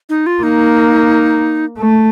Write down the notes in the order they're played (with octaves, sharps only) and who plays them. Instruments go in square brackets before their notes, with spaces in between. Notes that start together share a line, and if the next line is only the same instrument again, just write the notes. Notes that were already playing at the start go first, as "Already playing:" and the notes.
[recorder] D#4
F4
[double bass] A#3 [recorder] D#4
[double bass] A3